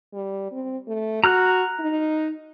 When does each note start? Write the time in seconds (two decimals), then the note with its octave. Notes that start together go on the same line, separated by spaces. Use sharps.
0.13 G3
0.52 C4
0.88 A3
1.24 F#4 A#5 F6 F#6
1.80 D#4